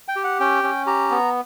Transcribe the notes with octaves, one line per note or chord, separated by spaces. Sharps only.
G5
G4
F#5
C#4 G5
C#4
G4 A#5
B3